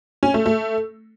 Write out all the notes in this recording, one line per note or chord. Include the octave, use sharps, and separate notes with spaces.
C#4
A3
A3